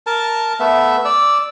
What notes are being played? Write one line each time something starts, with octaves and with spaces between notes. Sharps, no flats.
A#4 A5
A3 B3 E5
D5 E6